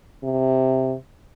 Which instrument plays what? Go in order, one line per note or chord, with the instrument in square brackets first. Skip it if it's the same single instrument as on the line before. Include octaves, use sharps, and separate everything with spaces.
[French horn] C3